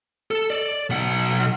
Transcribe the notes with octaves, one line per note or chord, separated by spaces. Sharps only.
A4
D5
B1 F#5